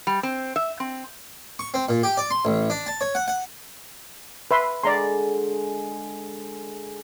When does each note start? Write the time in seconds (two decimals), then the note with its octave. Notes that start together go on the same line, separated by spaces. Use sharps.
0.07 G3
0.23 C4
0.56 E5
0.80 C4
1.59 C#6
1.74 C4
1.89 A#2
2.03 G4
2.17 D5
2.31 C6
2.45 A1
2.70 D4
2.86 A5
3.01 C#5
3.15 F#5
3.28 F#5
4.51 B4 E5 C6
4.83 D3 G#3 D5 A#5 C6